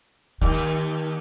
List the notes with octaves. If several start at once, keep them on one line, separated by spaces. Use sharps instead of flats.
D#2 D#3